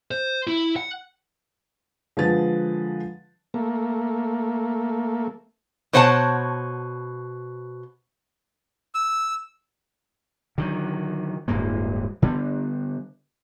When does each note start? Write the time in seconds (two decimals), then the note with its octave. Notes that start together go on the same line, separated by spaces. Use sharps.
0.11 C5
0.47 E4
0.76 F#5
2.17 D3 F3 G#3 B4 A6
3.54 A3 A#3
5.93 B2 C5 C#5 F#5 G#5 A5
8.95 E6
10.58 D3 D#3 F#3
11.48 D1 G2 G#3 A#3
12.22 D3 G3 B3